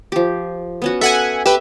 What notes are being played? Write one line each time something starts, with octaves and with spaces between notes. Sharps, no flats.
F3 G4
B3 C#4 F#4
A4 E5 F#5 G#5
G4 B4 E5